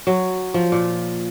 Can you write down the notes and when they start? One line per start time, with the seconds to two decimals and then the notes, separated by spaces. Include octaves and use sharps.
0.07 F#3
0.54 F3
0.72 A#2